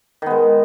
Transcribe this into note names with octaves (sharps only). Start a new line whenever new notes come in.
D#3 G#3 B3